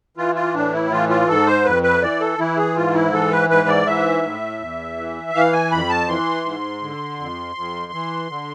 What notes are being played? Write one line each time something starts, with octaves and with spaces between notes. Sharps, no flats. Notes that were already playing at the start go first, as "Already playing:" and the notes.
E3 F4
F4
A2 D4
E4
E3 F4
F4
G#2 A4
C5
F2 B4
B4
E3 D5
A4
E3 E4
G#4
G#2 F4
E4
E3 A4
B4
G#2 B4
D5
E3 E5
A2
E2
E3
E3 F5
G#5
F2 B5
A5
E3 C6
G#2
D3
F2
F2
E3
D3